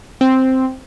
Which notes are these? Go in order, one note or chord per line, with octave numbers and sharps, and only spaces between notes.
C4